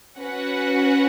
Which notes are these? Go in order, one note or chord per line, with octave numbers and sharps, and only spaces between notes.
C#4 F#4 B4 F#5